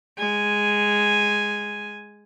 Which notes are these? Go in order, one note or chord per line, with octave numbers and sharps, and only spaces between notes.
G#3 G#5